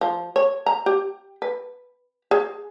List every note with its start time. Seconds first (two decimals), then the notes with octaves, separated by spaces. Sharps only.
0.01 F3
0.36 C#5
0.66 A#5
0.86 G4
1.42 B4
2.31 G#4